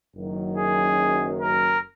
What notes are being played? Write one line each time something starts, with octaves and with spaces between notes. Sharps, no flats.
F#1 F#2 D#3 F#3
G#4
A#4